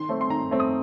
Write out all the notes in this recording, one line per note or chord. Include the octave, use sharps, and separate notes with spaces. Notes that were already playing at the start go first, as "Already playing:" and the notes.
Already playing: D#3 C6
A3 C4
C6
D#3 A#5
A3 C4
D#6